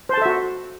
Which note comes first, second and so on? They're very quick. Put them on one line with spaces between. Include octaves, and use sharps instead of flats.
C5 A5 A4 E5 F#4